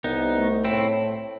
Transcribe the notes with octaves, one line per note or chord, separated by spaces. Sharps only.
C2 B3 D#4
A3
A2 C4 E4